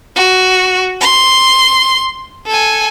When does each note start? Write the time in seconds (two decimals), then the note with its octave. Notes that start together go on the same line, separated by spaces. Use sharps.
0.16 F#4
1.01 C6
2.47 A4 G#5